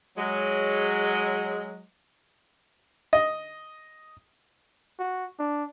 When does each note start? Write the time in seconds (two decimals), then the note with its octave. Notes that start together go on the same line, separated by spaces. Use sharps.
0.17 F#3 G#3
3.13 D#5
4.99 F#4
5.39 D4